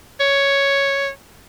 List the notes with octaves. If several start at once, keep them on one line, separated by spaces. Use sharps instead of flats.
C#5